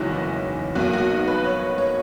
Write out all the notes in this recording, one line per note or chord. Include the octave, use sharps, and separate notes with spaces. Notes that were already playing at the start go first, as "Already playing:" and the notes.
Already playing: F#1 E2 D#3 G#3 C#4 E4 F#4
B1 B2 A#3 F#4
F#4
D#4
B4
C#5
C#5